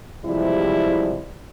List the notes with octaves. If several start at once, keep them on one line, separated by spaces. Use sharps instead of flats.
C3 E3 F3 G3 G#3 E4